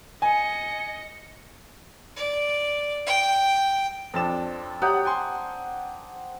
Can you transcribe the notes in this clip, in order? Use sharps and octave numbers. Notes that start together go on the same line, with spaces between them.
D#5 G#5 C#7
D5
G5
F2 F3 C4 D4 A6 E7
G4 C#5 E5 F#5 A#5 D#6 G6
G5 G#5 C6